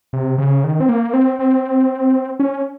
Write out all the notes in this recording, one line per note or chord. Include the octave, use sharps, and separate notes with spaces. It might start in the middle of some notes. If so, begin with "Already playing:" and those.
C3
C#3
D#3
C4
A#3
C4
C4
C#4